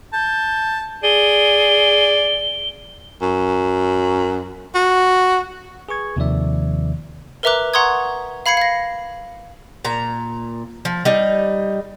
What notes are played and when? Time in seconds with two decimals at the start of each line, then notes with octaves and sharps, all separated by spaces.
0.13 A5 G6
1.03 G#4 D5 G7
3.22 F#2
4.75 F#4
5.89 G#4 B4 C#6 G#6
6.16 D#2 C3 D#3 F3 D5 E5
7.43 A#4 B4 E5 A#5 D6 F#6
7.74 F#5 A#5 C6 C#6 D#6 G#6
8.46 F5 B5 G#6 C7 C#7
8.57 F5 A#6
9.85 A#2 A#5
10.85 F3
11.05 G3 D#4